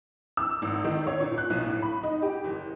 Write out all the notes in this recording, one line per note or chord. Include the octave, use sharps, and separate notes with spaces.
E6
G#1
D#3
C#5
A#2
F#6
B1
A2
B5
D#4
G4
F#1